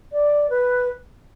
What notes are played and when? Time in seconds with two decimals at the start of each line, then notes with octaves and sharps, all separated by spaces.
0.12 D5
0.50 B4